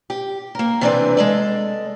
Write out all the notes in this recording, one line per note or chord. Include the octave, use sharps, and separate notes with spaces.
G4
A#3 A#4
C3 E3 C4 D4 B4 D5
G#3 A4 D5